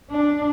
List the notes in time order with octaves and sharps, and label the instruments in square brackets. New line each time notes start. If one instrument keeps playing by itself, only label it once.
[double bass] D4